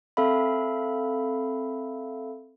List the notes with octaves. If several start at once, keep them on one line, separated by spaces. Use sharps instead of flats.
C4 A4 E5 F5 B5